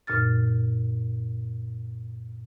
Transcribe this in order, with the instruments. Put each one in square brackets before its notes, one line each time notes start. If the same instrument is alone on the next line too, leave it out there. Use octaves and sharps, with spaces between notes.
[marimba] F#2 A#2 D#4 F6 A6